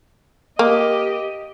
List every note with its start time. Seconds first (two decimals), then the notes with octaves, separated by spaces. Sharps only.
0.59 A#3 G4 D#5